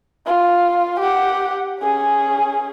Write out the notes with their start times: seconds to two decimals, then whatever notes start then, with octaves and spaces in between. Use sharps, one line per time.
0.26 F4
1.00 G4 F#5
1.80 C#4 G#4